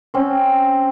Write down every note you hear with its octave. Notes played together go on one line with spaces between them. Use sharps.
C4 C#4